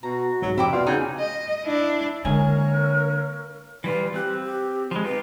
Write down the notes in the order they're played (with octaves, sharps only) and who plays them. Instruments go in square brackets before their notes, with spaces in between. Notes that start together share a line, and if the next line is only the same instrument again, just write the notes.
[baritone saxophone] B2 [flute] F#4 [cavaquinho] A#5
[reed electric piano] C2 G#2 [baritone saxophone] F#3
[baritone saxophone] F2 [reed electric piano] C3 F3 [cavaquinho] E4 G5 D6
[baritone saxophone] B2 [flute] F4 [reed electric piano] D5 F5 C6
[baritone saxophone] C#3 [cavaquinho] D#4 [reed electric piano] F#4 G6 [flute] G#5
[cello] D#5
D4 E4
[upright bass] D3 [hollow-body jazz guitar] G#3 G#5 [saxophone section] A#3 C4 C#5 [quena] A#4
[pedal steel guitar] E3 G3 F4 [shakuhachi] B4
[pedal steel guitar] C4 F#6 [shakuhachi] G4
[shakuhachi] G4
[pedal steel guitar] F3 G#3 [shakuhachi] B5
[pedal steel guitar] D#4 F4 G4 [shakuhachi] B4